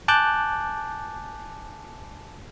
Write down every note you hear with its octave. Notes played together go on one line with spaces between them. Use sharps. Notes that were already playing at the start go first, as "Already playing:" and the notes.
G#5 A5 D6 F#6 G6